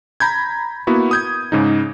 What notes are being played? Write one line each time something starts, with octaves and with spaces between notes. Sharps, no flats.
A#5 B5 G6 G#6
A#3 B3 E4 F#4
D#6 G6 G#6
G#2 C#3 D#4